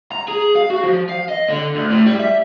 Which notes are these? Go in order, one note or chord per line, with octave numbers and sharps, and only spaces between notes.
A#5
G#4
F5
F#4
F3
F5
D#5
D3
D2
A2
G3
E5